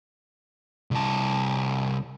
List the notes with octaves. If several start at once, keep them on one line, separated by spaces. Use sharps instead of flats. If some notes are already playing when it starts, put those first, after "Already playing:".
C2 A5